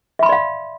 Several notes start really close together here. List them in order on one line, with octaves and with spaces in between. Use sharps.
E5 B5 C6 D5 F5